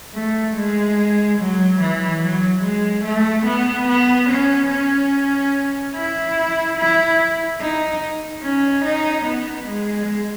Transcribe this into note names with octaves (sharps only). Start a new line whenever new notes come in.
A3
G#3
F#3
E3
F#3
G#3
A3
B3
B3
C#4
C#4
E4
E4
D#4
C#4
D#4
B3
G#3